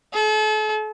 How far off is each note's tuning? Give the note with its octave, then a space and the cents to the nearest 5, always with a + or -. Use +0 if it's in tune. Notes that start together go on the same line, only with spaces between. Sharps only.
A4 -40